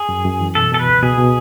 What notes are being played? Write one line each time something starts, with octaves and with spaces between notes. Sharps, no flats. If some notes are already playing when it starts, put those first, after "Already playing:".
Already playing: G#4
F#2
F#2
E3
B2 A4
B2 A4
B4
C#2
B2 G#4
B2